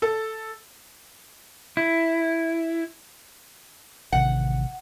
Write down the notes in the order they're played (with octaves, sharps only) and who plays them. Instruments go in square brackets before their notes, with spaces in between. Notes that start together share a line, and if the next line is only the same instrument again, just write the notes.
[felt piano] A4
[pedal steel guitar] E4
[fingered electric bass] A1 C3 D#3 [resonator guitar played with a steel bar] F#5